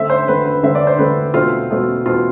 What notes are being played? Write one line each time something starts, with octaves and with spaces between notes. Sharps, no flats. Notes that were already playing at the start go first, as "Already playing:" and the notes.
Already playing: D3 A3 C4 E5
C5
D3 A3 C4 B4
B4
D3 A3 C4 E5
D5
C5
D3 A3 C4 B4
B2 A3 C4 F4
B2 A3 C4
B2 A3 C4 F4